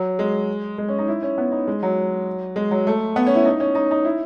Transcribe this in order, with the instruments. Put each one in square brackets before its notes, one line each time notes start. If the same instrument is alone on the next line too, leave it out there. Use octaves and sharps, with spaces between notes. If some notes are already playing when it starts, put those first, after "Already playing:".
Already playing: [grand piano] F#3
G#3
G#3
C#4
D#4
E4
C#4
B3
D#4
G#3
F#3
G#3
F#3
A3
B3
C#4
E4
D#4
C#4
D#4
D#4
E4